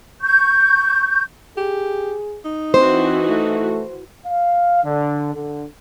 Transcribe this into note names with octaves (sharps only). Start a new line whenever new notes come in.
C#6 G6
G4 G#4
D#4
E3 C4 F#4 C5
A3
F5
D3
D3